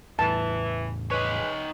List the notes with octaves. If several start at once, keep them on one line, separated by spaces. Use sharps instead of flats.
E2 A2 E3 A5
G#3 D#4 G#4 B4 C#5